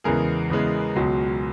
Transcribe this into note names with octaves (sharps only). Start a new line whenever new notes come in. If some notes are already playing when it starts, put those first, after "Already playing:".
E2 C#3 E3 G#3 B3 G#4 A#4
E2 C#3 E3 G#3 B3
C#2 B2 F#3